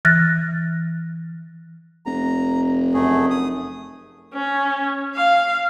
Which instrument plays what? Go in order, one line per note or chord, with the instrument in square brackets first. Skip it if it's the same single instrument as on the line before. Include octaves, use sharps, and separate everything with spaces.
[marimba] E3 F6 F#6 A6 A#6
[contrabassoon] F1 [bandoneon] A#5
[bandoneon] F#2 A3 G#4
D#6
[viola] C#4
F5